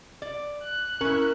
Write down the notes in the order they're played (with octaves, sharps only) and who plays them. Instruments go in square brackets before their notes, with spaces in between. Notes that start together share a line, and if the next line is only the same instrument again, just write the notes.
[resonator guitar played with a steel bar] D5
[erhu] F#6
[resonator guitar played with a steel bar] C#4 E4 [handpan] A#4